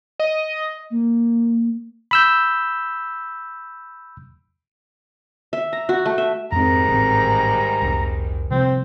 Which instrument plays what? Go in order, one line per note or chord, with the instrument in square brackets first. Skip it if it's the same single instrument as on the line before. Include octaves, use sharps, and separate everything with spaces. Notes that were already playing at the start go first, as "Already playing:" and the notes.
[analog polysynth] D#5
[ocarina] A#3
[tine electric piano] B5 E6 G6
[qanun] E5
A#5
F#4
A3
E5
[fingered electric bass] F2 C4 [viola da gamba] G#2 D#3 G3 [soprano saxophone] A#5
[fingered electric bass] A1 C4
F1 C2
[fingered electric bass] C3 F3 G3 [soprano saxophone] C4